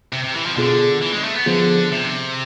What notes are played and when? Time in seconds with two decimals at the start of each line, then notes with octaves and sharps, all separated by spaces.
0.13 C3
0.24 C3
0.34 E3
0.46 F3
0.57 B2 D3 B3 F4 G#4
1.01 E3
1.13 G#3
1.24 A3
1.35 B3
1.46 D3 F3 B3 F4 G#4
1.92 C3